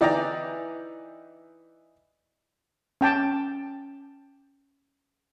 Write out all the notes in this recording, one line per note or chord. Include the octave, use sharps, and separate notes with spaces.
E3 D#4 D5 G5 A#5
C#4 G5 A5 D6